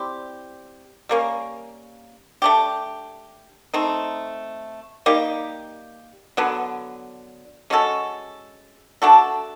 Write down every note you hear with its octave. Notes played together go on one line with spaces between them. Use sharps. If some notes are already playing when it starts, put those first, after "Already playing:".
Already playing: G3 C4 E4 G4
G3 A#3 C#4
A3 D4 G4
A3 C4 D#4
G3 A#3 D#4 G4
D3 F#3 B3
G#3 C#4 F#4 A4
A3 D4 F#4 A4